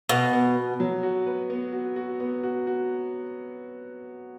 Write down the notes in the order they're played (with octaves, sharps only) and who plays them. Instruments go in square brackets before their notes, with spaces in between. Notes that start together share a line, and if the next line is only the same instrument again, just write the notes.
[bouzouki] B2 [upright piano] B3
[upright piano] B3
B3
F#3
F#4
B4
B3
F#4
F#4
B3
F#4
F#4